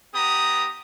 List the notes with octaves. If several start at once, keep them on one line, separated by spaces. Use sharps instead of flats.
B3 G4 A#5 D#6